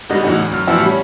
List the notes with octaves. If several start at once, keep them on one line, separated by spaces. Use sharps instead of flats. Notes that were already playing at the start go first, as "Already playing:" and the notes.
G#2 D3 G3 B3 D#5
E2 A2 D3 D#4 F#4
D2
F#2 F6
A2 E3 F3 B3 E4 F#4
G3 C#4